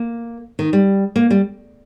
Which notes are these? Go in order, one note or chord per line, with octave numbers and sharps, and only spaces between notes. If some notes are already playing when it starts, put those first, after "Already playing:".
Already playing: A#3
D#3
G3
A#3
G3